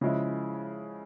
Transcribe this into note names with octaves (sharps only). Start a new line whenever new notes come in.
C#3 F3 G#3 E4